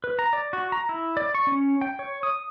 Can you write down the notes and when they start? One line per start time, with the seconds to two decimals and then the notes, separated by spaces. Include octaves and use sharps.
0.04 B4
0.19 A#5
0.33 D5
0.53 F#4
0.72 A#5
0.89 E4
1.17 D5
1.35 C#6
1.47 C#4
1.81 G5
1.99 C#5
2.23 D#6